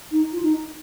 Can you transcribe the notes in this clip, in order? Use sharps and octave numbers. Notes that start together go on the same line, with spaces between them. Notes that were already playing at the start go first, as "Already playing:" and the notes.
D#4
F4
D#4